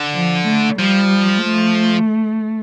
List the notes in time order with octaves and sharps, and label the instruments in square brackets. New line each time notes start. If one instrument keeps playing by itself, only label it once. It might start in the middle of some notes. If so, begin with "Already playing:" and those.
Already playing: [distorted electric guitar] D3
[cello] F3
A3
[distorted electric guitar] F3 [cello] G3
[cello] A3